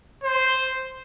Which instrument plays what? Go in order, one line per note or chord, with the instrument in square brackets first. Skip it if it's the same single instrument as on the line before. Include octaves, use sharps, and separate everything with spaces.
[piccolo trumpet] C5